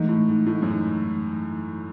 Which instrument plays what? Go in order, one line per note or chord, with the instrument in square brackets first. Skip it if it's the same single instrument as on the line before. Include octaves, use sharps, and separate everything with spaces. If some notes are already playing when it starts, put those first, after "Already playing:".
Already playing: [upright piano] G#2 [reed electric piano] E3 A3 D#4
[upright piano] A2
G#2
A2
G#2
F#2
G#2